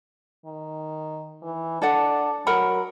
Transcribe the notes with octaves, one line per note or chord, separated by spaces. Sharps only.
D#3
E3
D4 A4 D5 F#5
F#3 A#4 F#5 B5